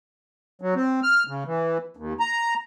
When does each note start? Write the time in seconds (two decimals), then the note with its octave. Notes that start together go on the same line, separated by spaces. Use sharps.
0.62 F#3
0.75 C4
1.03 F6
1.28 C#3
1.46 E3
1.97 D#2
2.20 A#5